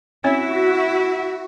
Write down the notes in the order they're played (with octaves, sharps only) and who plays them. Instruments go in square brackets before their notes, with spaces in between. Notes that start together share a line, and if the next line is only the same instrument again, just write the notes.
[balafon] C4 C#4 C#5 [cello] E4 E5 [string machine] F#4